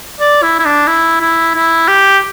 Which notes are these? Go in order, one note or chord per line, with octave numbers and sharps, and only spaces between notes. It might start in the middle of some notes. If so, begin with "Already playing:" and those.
D5
E4
E4
D4
E4
E4
E4
G4